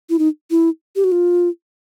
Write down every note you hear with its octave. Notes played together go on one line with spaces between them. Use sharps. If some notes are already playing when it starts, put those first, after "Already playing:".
E4
D#4
E4
G4
F#4
F4